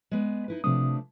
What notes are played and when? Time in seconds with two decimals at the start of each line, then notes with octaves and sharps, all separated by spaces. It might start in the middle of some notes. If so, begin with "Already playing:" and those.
0.11 G#3 B3 D5
0.48 D#4 E4 B4
0.64 C3 F3 A3 D4 D#6